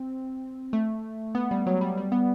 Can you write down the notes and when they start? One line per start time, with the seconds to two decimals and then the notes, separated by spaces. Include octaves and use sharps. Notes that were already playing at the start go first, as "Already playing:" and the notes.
Already playing: C4
0.73 A3
1.35 B3
1.51 G3
1.67 F#3
1.81 G3
1.97 G3
2.12 B3